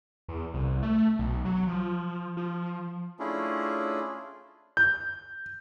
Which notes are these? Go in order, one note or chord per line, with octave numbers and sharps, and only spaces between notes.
E2
C2
A3
B1
F#3
F3
F3
A3 C#4 D4 E4 F4 G#4
G6